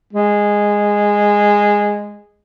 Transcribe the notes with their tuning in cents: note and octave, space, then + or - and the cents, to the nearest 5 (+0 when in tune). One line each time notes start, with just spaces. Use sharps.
G#3 -10